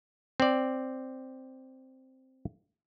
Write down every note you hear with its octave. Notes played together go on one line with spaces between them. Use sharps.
C4 D5